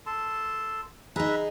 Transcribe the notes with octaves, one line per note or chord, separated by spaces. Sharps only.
A4 A5 C6
D#4 G#4 B4 E5 A#5